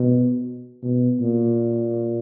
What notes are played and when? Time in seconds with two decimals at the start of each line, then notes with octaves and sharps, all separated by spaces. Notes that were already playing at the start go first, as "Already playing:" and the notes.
Already playing: B2
0.83 B2
1.20 A#2